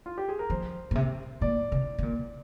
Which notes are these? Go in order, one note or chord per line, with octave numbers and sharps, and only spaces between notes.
F4
G4
G#4
A#4
F3 C5
A#2
C3
A#2 D5
C3
C3
A#2